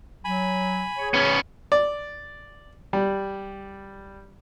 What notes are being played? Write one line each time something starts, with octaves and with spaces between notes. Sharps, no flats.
F#3 G#5 B5
G#4 C#5
B3 C#4
D5
G3